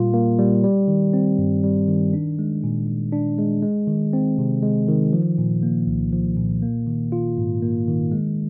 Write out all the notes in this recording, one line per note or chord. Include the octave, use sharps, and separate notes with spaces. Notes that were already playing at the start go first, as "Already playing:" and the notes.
Already playing: A#2 G3 A#3 F4
A#3
G3
G3
D#3
C4
G2
G3
D#3
D4
G#3
A#2
A#2
D4
G#3
G#3
D#3
C4
C3
G#3
D#3
F3
A#2
A#3
C2
F3
A#2
A#3
D#3
F4
G#2
A#3
D#3
G#3